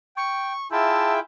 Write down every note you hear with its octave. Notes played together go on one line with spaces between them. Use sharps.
G5 C#6
E4 F4 G#4 E5 G5 A5